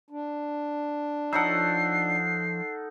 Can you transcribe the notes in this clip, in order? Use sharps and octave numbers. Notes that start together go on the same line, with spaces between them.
D4
F3 D#4 A4 C#5 F#5 E6 C7